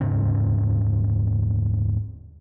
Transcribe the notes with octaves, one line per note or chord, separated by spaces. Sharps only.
D#1 G#2 C#3 C#4